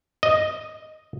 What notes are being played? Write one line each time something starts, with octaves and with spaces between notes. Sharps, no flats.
D#5